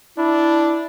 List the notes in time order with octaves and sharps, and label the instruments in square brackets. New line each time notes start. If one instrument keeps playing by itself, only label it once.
[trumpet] D4 [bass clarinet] E4